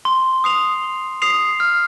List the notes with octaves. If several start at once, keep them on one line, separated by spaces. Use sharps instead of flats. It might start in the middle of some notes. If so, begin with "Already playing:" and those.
C6
D#6 C7 F7
C6
D#6 C7 F7
F6